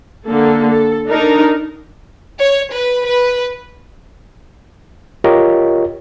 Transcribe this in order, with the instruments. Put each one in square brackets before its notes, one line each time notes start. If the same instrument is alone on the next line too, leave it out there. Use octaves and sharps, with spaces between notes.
[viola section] D3 A#3 A4
A4
D4 D#4 A#4
[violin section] C#5
B4
B4
[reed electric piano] F4 G4 A#4 C#5 D#5